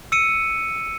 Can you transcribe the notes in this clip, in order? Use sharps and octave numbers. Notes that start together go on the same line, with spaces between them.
E6 C#7 D#7